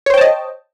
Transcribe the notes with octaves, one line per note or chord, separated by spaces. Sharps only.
C5 C#5 D#5 G5 A5